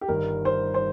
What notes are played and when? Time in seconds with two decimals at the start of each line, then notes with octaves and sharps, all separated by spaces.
0.01 G4
0.08 G1 G2 D#3 A#4
0.45 C5
0.74 C5